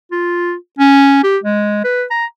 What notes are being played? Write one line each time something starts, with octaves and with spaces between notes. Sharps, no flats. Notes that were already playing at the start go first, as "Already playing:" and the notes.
F4
C#4
G4
G#3
B4
A#5